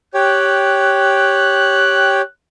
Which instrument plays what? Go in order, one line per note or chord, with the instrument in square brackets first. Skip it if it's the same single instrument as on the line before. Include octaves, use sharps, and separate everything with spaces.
[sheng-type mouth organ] G4 C#5 G5 [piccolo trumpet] F#6